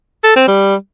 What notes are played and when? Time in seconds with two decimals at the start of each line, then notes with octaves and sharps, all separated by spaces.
0.24 A4
0.36 C4
0.48 G3